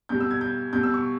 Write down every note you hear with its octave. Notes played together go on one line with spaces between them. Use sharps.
B2 G3 G6
E6
G#6
G6
B2 G3 G6
E6
C#6